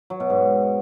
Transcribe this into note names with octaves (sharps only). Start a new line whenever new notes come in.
F#3
B2
G#2